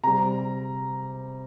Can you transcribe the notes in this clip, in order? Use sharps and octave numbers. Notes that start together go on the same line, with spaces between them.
C3 G3 A#5